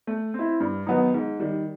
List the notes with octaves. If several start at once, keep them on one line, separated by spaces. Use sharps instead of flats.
A3
C4
E4
G2
D#3 F#3 B3 D#4
G#2
D#3 G3